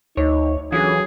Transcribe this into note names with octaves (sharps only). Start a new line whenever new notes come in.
D2 D#4 C#5
D3 E3 F#3 C#4 F4 G#4